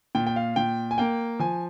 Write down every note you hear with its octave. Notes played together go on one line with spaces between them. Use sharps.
A#2 G5
G5
F5
A#2 G5
G#5
A#3 G5
F3 G#5